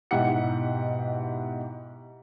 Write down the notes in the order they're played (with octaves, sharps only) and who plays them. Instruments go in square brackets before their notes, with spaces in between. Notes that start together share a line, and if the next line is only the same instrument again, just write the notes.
[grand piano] G#2 B2 E4 G4 F#5 C#7